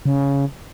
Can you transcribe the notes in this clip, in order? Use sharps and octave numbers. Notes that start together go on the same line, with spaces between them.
C#3